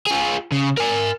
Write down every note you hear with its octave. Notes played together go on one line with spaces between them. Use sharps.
F4 G#4
C#3
A#4 G#5